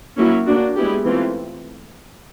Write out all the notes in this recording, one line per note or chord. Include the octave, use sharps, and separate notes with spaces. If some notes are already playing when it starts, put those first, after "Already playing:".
F#3 A#3 C#4 E4
A#3 D4 F#4
G#3 B3 E4 G4
E3 A3 C4 F4